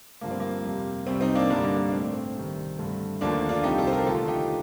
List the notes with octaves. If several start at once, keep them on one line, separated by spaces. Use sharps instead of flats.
G2 D3 F3 A3 A#3
C4
A#3
F2 C3 G3
C2 C3 G3 C4
C4 D#4
A#3 D4
G2 D3 G3 A#3 D4
A#3
A#3
A2 A3 C4
C4
C2 C3 D#3
G2 D3 A3
D#2 D3 F3 A3 A#3 D4
D4 F4
C2 C3 F3 D#4 G4
F4 A4
C5
G4 A#4
D#2 D3 A3 F4 A4
D#4 G4